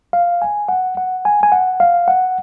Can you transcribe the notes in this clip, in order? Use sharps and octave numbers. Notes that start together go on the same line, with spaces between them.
F5
G#5
F#5
F#5
G#5
G#5
F#5
F5
F#5